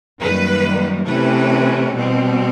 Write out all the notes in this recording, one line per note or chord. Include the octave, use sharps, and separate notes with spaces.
F#2 D#3 G3 A#3 B4
C3 E3 A3 C#4 B4
B2 G3 C4